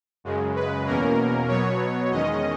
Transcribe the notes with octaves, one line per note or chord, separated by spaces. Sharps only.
F#2 C#3 G#3
B4
E2 B2 A#3 C#4 A#4
B2 F#3 B3 C#5
E2 D#3 G#3 C#4 D#5